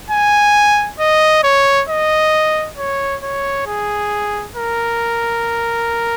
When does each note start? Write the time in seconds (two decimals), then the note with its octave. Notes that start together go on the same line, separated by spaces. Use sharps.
0.10 G#5
0.99 D#5
1.43 C#5
1.89 D#5
2.77 C#5
3.23 C#5
3.67 G#4
4.56 A#4